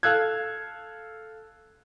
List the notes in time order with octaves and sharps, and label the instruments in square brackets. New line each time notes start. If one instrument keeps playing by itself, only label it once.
[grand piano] A4 F5 E6 F#6 G#6